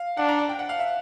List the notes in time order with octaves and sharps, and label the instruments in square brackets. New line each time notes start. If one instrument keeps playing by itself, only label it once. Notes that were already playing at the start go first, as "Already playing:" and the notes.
Already playing: [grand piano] F5
[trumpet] D4 [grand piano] F#5
[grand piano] A#5
A5
G5
F#5
F5
E5